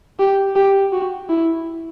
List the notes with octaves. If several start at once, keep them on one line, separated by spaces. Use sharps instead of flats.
G4
G4
F#4
E4